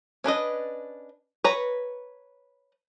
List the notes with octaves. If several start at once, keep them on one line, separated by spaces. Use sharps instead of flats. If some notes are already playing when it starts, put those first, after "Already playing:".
C#4 D4 B4 D#5
B4 C#5 A#5